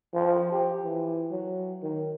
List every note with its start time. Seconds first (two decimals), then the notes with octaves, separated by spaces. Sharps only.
0.14 F3
0.52 G4
0.84 E3
1.31 F#3
1.82 D#3